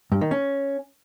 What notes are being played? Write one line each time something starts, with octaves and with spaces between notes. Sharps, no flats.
G2
D#3
C#4